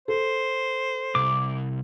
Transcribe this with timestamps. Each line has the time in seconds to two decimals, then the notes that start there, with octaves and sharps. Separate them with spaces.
0.08 A4 C5
1.15 C2 D6